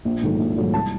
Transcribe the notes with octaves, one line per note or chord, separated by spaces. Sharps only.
A#1
G#2 D#3 F#3 A3
A#1
G#2 D#3 F#3 A3
C2 A5